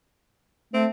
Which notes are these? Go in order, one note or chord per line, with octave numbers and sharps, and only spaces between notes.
A3 C4